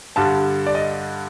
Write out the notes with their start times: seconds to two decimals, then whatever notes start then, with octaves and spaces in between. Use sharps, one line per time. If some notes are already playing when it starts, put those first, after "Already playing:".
0.16 G2 D3 G3 A5
0.67 D5
0.75 D#5